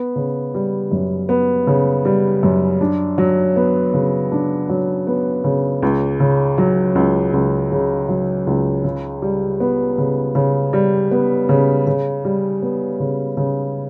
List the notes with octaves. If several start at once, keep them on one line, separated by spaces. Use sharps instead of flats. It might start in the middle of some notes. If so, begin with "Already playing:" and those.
Already playing: B3
C#3
G3
F#2
B3
C#3
G3
F#2
D4
F#3
B3
C#3
D4
F#3
B3
C#3
C#2
C#3
F#3
C#2
C#2
C#3
F#3
C#2
C#3
G3
B3
C#3
C#3
G3
B3
C#3
C#3
G3
B3
C#3
C#3